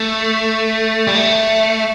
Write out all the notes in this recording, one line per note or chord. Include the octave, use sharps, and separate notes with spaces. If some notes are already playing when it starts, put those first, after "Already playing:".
Already playing: A3
G3
A3